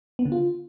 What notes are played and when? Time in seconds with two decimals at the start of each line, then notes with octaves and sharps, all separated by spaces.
0.19 B3
0.25 D3
0.32 F4